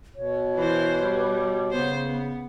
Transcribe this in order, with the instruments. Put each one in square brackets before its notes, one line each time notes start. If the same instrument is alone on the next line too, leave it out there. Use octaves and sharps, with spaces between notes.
[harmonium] B2 [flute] C#5
[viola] E3 C5 [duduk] B4
[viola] G3
[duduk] C#3 [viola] B3 C5
[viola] B3